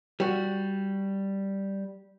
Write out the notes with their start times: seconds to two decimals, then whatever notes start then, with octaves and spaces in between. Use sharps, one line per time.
0.20 G3 F#4